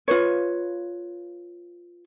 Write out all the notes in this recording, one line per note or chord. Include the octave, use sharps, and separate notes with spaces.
F4 B4 C#5